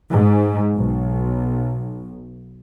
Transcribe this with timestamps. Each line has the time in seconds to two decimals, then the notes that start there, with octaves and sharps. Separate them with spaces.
0.12 G#2
0.77 B1